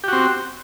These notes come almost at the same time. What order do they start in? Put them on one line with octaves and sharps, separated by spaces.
G4 F#4 C4